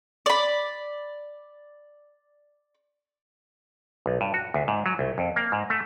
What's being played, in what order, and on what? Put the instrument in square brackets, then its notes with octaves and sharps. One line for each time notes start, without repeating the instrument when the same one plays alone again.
[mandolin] D5 B5
[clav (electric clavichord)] B1
G2
F#4
D2
G#2
F#3
C2
F2
A#3
G#2
A3